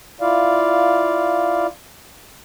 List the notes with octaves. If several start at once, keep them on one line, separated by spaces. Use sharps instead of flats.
E4 F4 D5 F5